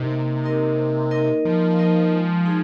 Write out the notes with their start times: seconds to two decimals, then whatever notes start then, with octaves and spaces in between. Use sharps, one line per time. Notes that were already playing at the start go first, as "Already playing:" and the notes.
Already playing: C3 A#3 D#4 A#4 D#5
0.10 A#3
0.44 D#4 A#4 D#5
0.78 A#3
1.11 D#4 A#4 D#5
1.45 F3 A#3
1.79 D#4 A#4 D#5
2.12 G#3
2.46 D#4 G#4